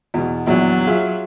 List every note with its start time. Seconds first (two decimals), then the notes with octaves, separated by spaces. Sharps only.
0.14 E2 B2
0.47 A#1 E2 F#3
0.87 F4 G#4 E5